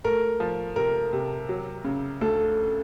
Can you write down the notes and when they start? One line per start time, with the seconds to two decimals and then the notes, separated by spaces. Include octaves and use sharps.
0.04 A3 A#4
0.40 F3
0.76 C3 A#4
1.13 C3
1.49 F#3
1.84 C#3
2.21 D2 A4